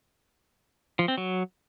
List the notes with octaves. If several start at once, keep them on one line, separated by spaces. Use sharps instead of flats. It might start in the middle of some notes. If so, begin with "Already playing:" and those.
F3
C4
F#3